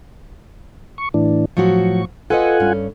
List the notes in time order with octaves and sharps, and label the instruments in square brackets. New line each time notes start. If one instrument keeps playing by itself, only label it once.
[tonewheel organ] C#6
A2 E3 D4
[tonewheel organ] A2 C#6 [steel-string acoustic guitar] F3 F#3 F#4
[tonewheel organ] F4 F#5 G#5 [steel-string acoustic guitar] A4 B4 D#5
[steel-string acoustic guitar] G2 C#4